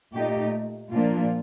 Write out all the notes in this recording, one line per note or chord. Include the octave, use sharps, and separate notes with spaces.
A#2 A3 D#4 G4
A#2 F3 A#3 D4 F4